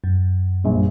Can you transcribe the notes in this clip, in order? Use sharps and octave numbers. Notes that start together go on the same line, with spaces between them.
F#2
A#1 G2